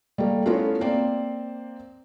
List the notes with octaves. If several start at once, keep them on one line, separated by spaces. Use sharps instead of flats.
G3 A3 A#3
A3 B3 C#4 E4 F4 A#4
A#3 C4 C5 D5